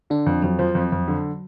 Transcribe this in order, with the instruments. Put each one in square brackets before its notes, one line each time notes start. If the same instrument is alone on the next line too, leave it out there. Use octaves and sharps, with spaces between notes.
[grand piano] D3 [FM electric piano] D4
[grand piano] F2
[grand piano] F2 [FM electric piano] F#3
[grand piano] F3
F2
F2
D3